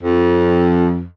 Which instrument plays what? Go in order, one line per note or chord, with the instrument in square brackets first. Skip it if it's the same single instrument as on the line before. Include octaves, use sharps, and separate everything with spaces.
[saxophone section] F2